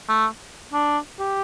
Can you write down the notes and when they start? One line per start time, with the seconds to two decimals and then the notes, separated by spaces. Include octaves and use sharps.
0.09 A3
0.73 D4
1.20 G4